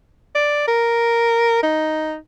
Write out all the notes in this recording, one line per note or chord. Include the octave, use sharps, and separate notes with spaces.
D5
A#4
D#4